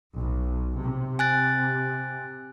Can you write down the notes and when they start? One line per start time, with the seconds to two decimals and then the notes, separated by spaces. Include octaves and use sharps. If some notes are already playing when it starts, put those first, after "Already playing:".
0.19 B1
0.82 C3
1.19 G#5 F#6 A6